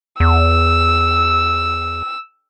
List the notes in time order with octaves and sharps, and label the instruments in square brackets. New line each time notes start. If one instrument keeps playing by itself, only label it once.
[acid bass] E2 [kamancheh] E6